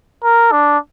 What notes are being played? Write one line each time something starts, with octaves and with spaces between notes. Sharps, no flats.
A#4
D4